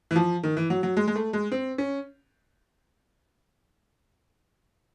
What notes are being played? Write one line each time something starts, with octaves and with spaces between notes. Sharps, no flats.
E3
F3
D#3
E3
F#3
F#3
G#3
G#3
A3
G#3
C4
C#4